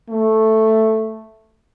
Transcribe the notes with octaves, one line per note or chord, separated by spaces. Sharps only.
A3